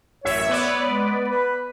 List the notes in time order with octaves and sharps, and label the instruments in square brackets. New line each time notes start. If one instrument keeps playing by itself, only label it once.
[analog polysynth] A1 F#2 E5 [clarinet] C#5
[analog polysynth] B3 B4 D5
[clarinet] G#3
B4